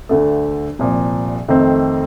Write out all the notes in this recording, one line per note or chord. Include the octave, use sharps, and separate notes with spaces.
D2 D3 A3
C2 A#2 F3
F2 D#3 A3 C4